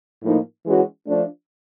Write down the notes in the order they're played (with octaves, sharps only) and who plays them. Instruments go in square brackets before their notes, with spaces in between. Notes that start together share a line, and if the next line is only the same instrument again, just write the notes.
[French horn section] A2 F3 A#3 D#4
E3 G#3 C#4 F#4
F3 A3 D4